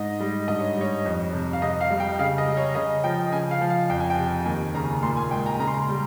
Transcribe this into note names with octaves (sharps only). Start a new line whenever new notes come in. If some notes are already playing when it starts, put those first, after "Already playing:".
Already playing: G#2 D#5
G3
G2 D#5
C#5
G3 C#5
F2
C3
F5
C3 D#5
F5
G3
G5
C#3 F5
D#5
G3
C#5
C#3 D#5
F3 G5
C#3 G#5
F5
F3
F5
F2 G5
G#5
G5
C3
D#2 G#5
C#3 A#5
A#2 C6
G#5
G#3 G5
A#5
C#3 A#5
C6
A#5
G3